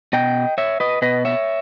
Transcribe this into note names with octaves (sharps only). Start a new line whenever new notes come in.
B2 D#5 G5
C#5 E5
B4 D#5
B2 B4 D#5
C#5 E5